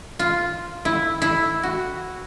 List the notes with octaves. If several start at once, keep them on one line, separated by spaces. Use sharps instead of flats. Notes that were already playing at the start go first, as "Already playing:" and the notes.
F4
E4
E4
F#4